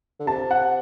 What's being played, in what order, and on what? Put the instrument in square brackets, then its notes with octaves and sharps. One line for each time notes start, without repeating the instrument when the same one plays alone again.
[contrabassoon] D3
[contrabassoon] C3 [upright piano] A5
[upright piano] F#5